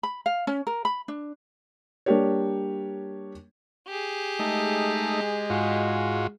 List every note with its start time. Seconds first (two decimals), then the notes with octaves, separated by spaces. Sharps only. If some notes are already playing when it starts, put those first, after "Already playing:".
0.03 B5
0.26 F5
0.47 C#4
0.67 A#4
0.85 B5
1.08 D4
2.06 G3 A#3 D4 G4 A#4 C#5
3.88 G4 G#4
4.39 G#3 A3 D#4
5.50 G#2 F4 F#4